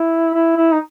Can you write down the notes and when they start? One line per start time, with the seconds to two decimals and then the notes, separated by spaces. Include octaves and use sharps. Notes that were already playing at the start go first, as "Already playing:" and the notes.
Already playing: E4
0.34 E4
0.57 E4
0.72 D#4